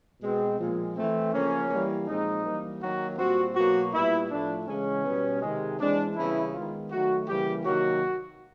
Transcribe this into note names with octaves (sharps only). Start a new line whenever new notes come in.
B2 G#3 C4
A#2 F3 G#3
E3 A3 C4
C#3 F3 A#3 C#4
E3 G3 A#3
A#2 F3 G#3 C4 D#4
E3 G3 A#3
D#3 F#3 A#3 F#4
A#2 G3 C4 F#4
B2 F#3 A#3 F#4
A#2 G3 B3 E4
A2 F3 A3 D4
C#3 E3 G#3 C#4
B2 G3 B3
C3 D#3 G#3
E3 G#3 C4 D4
C#3 E3 G3 B3 E4
D#3 G#3 B3 F4
D#3 F#3 A3 F#4
C#3 E3 G3 A#3 G4
C3 D#3 F#3 A#3 F#4